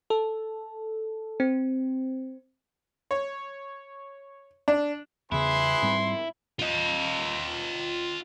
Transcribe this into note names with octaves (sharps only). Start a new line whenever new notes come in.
A4
C4
C#5
D4
E2 C#3 E4 G#4 B4 C6
G#2 G3 C4
F4 D#5